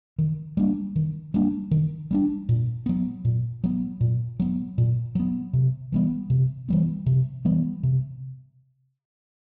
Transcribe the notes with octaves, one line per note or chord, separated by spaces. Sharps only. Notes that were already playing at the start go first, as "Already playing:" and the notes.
D#3
G3 A#3 D4
D#3
G3 A#3 D4
D#3
G3 A#3 D4
A#2
F#3 B3
A#2
F#3 B3
A#2
F#3 B3
A#2
F#3 B3
C3
E3 G3 B3
C3
E3 G3 B3
C3
E3 G3 B3
C3